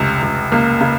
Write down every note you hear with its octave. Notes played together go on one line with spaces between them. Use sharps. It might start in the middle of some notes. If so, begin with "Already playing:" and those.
Already playing: F1 C#2
C#2
C#2 A#3
C#3